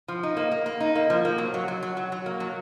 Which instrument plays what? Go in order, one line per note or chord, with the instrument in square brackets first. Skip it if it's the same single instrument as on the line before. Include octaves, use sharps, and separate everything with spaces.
[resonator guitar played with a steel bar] F3
D#4
A#3
A#3
A#3
D#4
A#3
F3
A#3
F#3
F#3
F#3
F#3
F#3
F#3
A#3
F#3